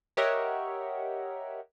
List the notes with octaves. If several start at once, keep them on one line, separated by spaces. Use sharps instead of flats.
G4 A#4 C#5 D#5 E5 F#5